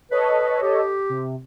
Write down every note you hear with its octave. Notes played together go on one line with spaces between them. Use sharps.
A4 B4 C#5 D#5
G4
C3